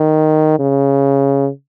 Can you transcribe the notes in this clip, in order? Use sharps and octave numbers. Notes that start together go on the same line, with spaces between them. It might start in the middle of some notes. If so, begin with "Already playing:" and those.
Already playing: D#3
C#3